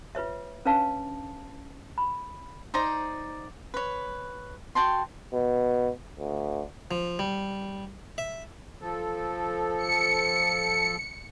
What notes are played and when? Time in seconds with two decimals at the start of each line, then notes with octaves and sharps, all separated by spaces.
0.15 F4 B4 C#5 E5
0.65 C#4 D4 B4 C#5 F5 A5
1.98 B5
2.74 D#4 C5 D5 A#5
3.74 B4 C#5
4.75 F#4 G5 A5 C6
5.33 B2
6.20 D2
6.91 F3
7.19 G3
8.18 E5
8.81 F3 A4
9.77 C#7